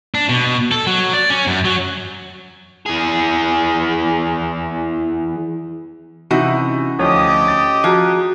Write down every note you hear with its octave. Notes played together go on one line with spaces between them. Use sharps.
D4
B2
A4
F#3
D5
C#4
F#2
F#3
E3 G#4
C3 E3 C#4 D#4 F#4
D2 F3 G4 C#5 D#5 D#6
A6
F3 F#4 G#4 A#5